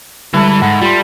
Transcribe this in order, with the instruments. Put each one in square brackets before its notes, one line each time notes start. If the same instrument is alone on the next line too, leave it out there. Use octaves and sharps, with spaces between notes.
[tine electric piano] D3 G3 G#3 [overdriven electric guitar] E3 B4 [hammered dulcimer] E4 A4
[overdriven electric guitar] G#2 [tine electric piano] F#5
[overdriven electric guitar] G3 [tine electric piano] F4 C6